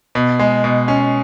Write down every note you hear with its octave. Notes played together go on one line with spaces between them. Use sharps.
B2
G#3
B2
C#4